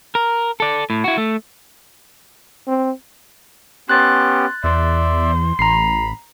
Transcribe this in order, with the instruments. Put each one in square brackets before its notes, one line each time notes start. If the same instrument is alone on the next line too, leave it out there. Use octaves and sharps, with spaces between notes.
[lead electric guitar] A#4
A4 D5
A2
E4 F#4
A3
[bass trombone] C4
[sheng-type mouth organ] B3 C#4 G4 [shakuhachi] C6 [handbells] F#6 A6
[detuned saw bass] E2 [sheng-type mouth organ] D5 E5 [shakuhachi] C6
[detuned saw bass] A1 [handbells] A#5 C7 [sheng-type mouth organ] B5